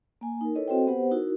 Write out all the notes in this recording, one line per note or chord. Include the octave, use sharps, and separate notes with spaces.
A#3 G#5
D#4 A#4
E4 A4 B4 C#5 D#5
C4 F#4 A4 C5 D#5 G5
B3 G4 B4 C5 F#5
D#4 E4 F#4 A#4